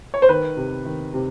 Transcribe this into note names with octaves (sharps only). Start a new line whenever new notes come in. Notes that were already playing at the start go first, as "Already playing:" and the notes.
C#5
C5
D#3 B4
C3
D#3
C3